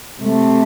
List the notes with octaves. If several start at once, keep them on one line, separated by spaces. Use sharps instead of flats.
C3 A3